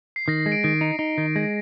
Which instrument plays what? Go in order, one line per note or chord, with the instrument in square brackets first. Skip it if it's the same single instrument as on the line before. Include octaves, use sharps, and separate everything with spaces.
[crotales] C7
[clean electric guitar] D#3 [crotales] A#6
[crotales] C7
[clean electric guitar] G#3
[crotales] D7
[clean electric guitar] D#3 [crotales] D7
[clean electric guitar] D#4
D#4
D#3
G#3